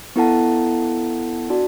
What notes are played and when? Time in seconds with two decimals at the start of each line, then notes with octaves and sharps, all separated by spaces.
0.16 B3 E4 A4 F#5 A5
1.49 D4 F#4 D5 A5